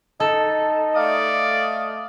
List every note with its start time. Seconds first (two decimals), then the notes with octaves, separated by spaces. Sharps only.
0.20 D#4 A4
0.95 A3 D5 D#5 F5